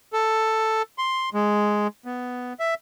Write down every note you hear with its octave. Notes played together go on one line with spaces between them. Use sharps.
A4
C6
G#3
B3
E5